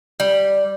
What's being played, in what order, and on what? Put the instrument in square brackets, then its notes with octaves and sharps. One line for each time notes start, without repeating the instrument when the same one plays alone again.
[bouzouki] G3